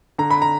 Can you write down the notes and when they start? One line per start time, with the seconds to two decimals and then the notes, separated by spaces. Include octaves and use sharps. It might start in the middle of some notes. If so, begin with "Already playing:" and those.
0.18 D3 A#5
0.30 B5
0.42 A#5